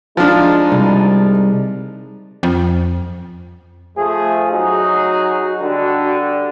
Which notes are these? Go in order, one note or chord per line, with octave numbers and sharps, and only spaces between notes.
F3 G#3 D4 D#4
C2
F2
F3 A3 G#4
F#3 D#4 F#4 G#4
D3 G3 D4